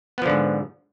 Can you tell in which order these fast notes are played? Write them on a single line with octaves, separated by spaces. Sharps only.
B3 F3 D3 G#2